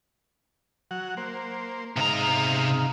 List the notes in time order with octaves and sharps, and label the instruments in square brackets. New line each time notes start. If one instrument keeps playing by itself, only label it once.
[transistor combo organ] F#3 F#5
A#3 C5
[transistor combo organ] G#2 D#4 F5 [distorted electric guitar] C3 A#5